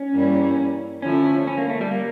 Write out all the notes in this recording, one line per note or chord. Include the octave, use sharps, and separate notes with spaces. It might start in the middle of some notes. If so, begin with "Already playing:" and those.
Already playing: C#4
G2 E3 G3 A#3
D3 F3 A3 C#4 E4
C#4
A#3
A3
G3
A#3